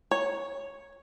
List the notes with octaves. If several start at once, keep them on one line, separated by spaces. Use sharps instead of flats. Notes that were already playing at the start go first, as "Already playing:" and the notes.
C#5